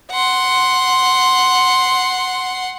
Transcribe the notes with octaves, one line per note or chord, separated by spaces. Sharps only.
F#5 C6